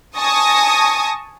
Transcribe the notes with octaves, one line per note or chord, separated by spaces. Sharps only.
G#5 A5 C#6 D#6 A#6